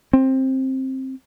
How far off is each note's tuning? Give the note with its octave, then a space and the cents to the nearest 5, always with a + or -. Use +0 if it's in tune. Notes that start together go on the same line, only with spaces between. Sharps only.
C4 +15